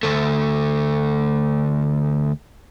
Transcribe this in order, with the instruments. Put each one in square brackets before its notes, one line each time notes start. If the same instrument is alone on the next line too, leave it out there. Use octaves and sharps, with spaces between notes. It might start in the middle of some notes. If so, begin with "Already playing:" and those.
[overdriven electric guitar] D2 A3